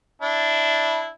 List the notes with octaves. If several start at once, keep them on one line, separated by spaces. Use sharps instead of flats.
D4 E4